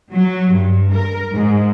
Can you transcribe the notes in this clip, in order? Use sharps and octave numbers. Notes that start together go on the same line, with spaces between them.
F#3
G2
A#4
G#2